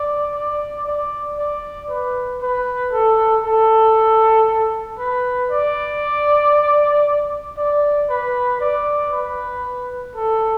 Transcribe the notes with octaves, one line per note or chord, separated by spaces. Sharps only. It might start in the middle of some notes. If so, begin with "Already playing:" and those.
Already playing: D5
D5
D5
D5
B4
B4
A4
A4
B4
D5
D5
B4
D5
B4
A4